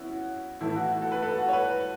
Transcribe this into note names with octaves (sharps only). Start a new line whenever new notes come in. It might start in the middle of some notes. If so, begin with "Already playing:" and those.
Already playing: B3 C#4 E4 F#4
A2 E3 E4
F#4
F#4
A4
B4
A4
F#4
C#5
B4